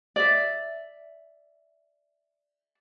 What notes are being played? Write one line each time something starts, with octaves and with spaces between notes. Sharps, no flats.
D5 E5